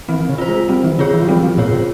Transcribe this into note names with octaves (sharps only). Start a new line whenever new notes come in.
E3 C4
C#3
F4 C5
G#3
G3 C4
E3
C#3 F4 G#4 C#5
E3
F3
G3 C4
F3
A#2 F4 G#4 C#5
C3